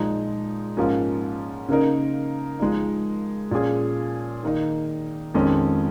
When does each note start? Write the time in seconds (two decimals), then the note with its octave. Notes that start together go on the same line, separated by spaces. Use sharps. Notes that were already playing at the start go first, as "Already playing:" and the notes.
Already playing: A#2 F3 G#3 D#4
0.77 G#2 F3 A#3 C#4
1.68 C#3 A#3 D#4 A#4
2.60 F3 G#3 D#4
3.51 A#2 F3 C#4 G#4
4.43 D#3 A#3 D#4
5.34 F2 D#3 G#3 C#4